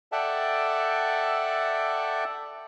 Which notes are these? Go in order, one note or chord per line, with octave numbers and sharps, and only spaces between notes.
A4 D5 E5 F#5 G5 A5